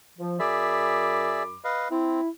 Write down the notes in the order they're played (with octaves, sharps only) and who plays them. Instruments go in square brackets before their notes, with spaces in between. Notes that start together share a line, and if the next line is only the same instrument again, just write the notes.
[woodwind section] F3
[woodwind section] F#2 B5 D6 [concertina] G#4 D5 E5
[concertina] B4 D#5 F5
[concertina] C4 [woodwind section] E4